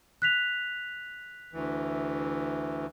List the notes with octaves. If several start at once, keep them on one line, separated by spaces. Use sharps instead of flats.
F#6 B6 F7
D2 E3